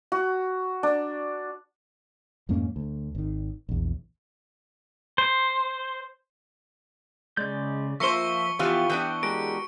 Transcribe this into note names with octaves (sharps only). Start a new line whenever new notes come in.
F#4
D4
F2 G#2 A#3 C#4
D2
G#1 D#3
A#1 E2
C5
C#3 G#3 D5 G6
F3 A#3 C5 E5 C#6 C#7 G7
E3 F3 B3 F4 G4
E3 B3 D4 G5
G#3 F#4 G4 A#4 D7